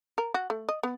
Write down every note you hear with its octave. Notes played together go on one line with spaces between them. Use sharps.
A#4
F#4
A3
D#5
B3